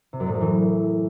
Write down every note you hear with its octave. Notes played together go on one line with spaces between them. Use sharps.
C3
F#2
A2
F#2
E3